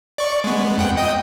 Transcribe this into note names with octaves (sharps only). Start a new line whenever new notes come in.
D5 C#6
G#3 B3
F2 F#5 G5
D#5 G5 D#6